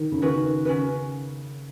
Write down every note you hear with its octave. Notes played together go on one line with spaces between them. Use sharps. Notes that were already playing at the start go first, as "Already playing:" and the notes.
Already playing: D#3
C#3
D#3 C#4 F#4 B4
C#3 C#4 F#4 B4